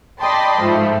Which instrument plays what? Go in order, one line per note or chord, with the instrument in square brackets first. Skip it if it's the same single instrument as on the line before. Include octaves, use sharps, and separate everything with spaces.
[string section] D5 D#5 G5 A5 B5 C6
G#2 F3 A3